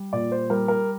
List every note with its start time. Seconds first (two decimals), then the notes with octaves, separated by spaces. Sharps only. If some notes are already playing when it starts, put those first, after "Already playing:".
Already playing: G3
0.13 A#2 D5
0.31 C5
0.50 G3 A#4
0.68 A#4